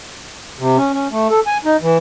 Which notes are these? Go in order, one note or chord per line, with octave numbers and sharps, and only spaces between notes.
C3
C#4
C#4
A3
A4
G#5
D#4
E3